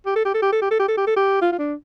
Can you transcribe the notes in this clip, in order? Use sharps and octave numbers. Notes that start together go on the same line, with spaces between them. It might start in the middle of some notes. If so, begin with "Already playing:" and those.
G4
A4
G4
A4
G4
A4
G4
A4
G4
A4
G4
A4
G4
F4
F4
D4